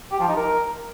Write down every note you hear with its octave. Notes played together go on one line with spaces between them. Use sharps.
G4
F3
D#4
A#4